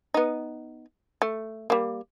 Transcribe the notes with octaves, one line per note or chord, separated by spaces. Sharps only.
B3 D#4
A3
G3 A#3